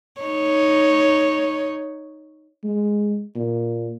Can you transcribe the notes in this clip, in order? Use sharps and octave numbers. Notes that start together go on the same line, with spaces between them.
D#4 C#5
G#3
A#2